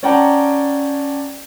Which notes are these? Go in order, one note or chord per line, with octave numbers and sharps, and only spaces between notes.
C#4 D5 F#5 G5 A5 A#5